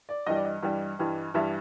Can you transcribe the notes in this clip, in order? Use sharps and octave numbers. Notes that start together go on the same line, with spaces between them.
D5
G2 E3 G3 D#5
D5
D#5
G2 E3 G3
G2 E3 G3
G2 E3 G3 E5